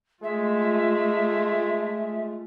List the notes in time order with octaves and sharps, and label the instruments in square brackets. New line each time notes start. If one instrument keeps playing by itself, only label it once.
[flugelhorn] G#3 [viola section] A3 F4 [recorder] E5